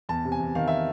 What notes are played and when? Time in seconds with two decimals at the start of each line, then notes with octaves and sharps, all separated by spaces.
0.09 E2 A5
0.25 C3
0.32 G#5
0.40 E2
0.55 D#3 F5
0.68 E5